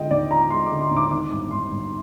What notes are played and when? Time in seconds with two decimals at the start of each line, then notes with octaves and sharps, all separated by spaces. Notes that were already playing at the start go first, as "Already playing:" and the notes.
Already playing: D3 F3 G#3 D#5 G5
0.11 D#2 D5
0.31 F3 A#5
0.50 G#3 C6
0.66 D6
0.71 D3
0.81 C6
0.91 D#2
0.96 D6
1.11 D#3 D6
1.31 G1 D6
1.51 G2 C6
1.72 G1